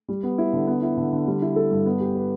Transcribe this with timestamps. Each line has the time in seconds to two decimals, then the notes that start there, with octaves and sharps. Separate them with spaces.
0.09 G3
0.23 B3
0.38 E4
0.53 D3
0.67 B3
0.82 E4
0.97 D3
1.12 D3
1.27 G3
1.42 E4
1.56 A4
1.71 G2
1.86 B3
2.01 G4
2.15 B4